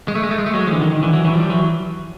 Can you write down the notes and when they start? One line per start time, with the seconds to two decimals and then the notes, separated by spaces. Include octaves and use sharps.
0.08 G#3
0.15 A3
0.23 G#3
0.31 A3
0.38 G#3
0.46 A3
0.54 F#3 G#3
0.67 F3
0.71 D3 E3
0.81 D#3
0.92 D#3
1.02 D3 E3
1.13 E3 F#3
1.25 E3 F#3
1.34 F3 G3
1.50 E3 F#3